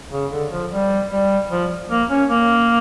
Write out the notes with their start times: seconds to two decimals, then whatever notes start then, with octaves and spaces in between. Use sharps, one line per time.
0.12 C#3
0.32 D3
0.51 F3
0.72 G3
1.10 G3
1.50 F3
1.90 A#3
2.10 C#4
2.29 A#3